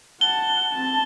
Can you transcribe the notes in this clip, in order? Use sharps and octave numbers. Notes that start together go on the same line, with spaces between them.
F#5 A5 G7
C4 A5